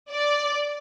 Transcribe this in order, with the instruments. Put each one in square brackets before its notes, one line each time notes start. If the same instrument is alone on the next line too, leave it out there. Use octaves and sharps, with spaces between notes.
[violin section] D5